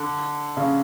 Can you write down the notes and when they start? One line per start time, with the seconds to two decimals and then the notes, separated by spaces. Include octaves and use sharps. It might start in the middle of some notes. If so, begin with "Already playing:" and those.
Already playing: D3
0.57 C#3